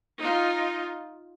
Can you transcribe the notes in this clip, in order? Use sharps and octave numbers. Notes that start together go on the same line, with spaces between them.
D#4 F4